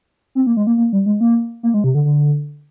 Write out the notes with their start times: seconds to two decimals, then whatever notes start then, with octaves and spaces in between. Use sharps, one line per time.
0.35 C4
0.47 A#3
0.57 G#3
0.67 A#3
0.78 A#3
0.93 G3
1.06 G#3
1.21 A#3
1.63 A#3
1.74 G#3
1.84 C3
1.95 D3
2.05 D3